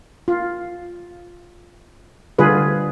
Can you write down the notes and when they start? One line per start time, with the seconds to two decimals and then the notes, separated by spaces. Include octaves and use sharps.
0.28 F4
2.38 D3 G3 F4 G#4 B4